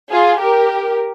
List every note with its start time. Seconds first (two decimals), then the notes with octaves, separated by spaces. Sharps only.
0.10 F4 G#4
0.39 G4 A#4